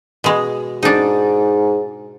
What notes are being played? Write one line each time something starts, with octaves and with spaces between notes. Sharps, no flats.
B2 G#3
G#2 D4 D#4